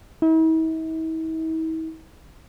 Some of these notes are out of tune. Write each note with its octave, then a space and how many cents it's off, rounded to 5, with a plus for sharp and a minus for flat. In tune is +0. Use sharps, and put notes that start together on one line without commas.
E4 -45